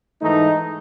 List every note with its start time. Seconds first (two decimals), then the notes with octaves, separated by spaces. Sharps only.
0.22 G#2 E3 A3 D#4